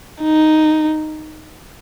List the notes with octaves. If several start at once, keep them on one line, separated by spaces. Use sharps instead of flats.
D#4